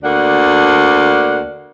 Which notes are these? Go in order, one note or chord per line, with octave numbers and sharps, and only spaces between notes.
D2 A#3 D4 F#5